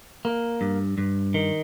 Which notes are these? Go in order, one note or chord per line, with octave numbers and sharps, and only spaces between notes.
A#3
G2
G2
D#3